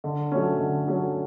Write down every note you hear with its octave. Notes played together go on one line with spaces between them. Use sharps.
D3
F#3 A3 C#4
D3
F#3 A3 C#4